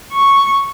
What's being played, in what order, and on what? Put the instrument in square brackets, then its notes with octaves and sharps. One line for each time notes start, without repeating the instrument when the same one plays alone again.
[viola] C#6